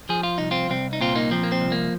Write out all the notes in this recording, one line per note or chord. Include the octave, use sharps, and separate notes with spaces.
F3 G#4
F4
C2 D#4
C4 F4
C2 C4
D#4
A#2 C4 F4
A#3 D#4
F3 C4
A#3
C4
C2
A#3